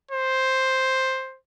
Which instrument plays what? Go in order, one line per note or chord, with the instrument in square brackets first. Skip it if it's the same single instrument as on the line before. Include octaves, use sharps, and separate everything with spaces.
[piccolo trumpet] C5